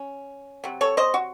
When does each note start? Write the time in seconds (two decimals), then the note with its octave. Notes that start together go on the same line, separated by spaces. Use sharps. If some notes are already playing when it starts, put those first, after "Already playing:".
Already playing: C#4
0.64 C3 F#3
0.81 A4 C#5
0.97 C5 D#5
1.14 F#4